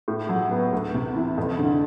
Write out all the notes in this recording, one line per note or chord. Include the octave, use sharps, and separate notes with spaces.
A2
F#3
B3
D2
C3
E3
F2
D3